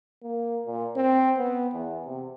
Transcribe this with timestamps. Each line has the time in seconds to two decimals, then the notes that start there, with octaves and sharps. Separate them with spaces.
0.22 A#3
0.66 A#2
0.96 C4
1.38 B3
1.74 E2
2.05 C3